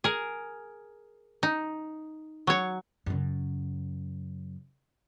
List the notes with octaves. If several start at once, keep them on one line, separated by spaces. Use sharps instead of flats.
G#4 A#4
D#4
F#3 C#5
F#2 C#3